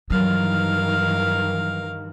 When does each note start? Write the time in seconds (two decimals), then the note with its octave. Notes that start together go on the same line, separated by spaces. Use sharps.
0.11 G2 D#3 E3 F#3 A#4 F5